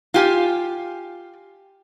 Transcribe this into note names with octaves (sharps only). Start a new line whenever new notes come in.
F4 G4 G#5